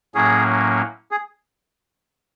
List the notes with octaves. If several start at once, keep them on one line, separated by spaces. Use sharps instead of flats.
A2 F#3 A#3 C#4 G#4
G#4